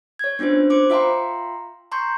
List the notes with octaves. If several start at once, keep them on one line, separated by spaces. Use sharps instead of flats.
C#5 G#6
B3 C#4 D4 F4 C5
C5 D6
F4 E5 F5 G5 A#5 C6
A#5 C6 C#6 G6